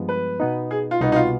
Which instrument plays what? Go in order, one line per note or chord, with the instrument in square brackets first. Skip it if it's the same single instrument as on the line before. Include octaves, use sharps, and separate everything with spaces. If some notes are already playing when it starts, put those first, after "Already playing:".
Already playing: [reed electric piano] G2 F3 G#3 B3
[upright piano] B4
[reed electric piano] B2 B3 D#4
[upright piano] G#4
F4
[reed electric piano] C2 B2 B3 [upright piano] D#4
[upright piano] D#4
F4